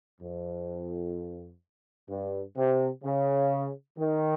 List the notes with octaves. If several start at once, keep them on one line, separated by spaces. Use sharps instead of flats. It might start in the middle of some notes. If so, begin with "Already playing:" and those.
F2
G2
C3
C#3
D#3